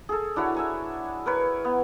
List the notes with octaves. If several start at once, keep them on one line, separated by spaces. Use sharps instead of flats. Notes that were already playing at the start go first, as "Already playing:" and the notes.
G#4 A4
D4 E4 F#4 C#5
E5 G#5 A#5
A#4 B4 C#5
B3